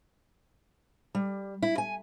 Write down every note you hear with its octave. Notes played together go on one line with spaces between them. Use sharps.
G3
E4
G#5